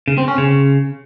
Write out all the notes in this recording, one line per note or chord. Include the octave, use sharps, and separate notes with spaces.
C#3
C4
C#4
C#3